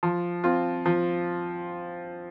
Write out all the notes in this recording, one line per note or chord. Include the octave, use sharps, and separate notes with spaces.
F3
C4 F4
F3